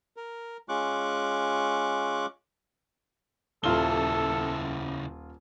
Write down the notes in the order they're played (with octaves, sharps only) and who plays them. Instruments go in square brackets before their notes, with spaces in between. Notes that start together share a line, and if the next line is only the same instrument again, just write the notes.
[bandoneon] A#4
G#3 C#4 F4 C#6 D6 F#6
[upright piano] D#1 F4 G7 [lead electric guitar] C#3 E4 [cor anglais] A4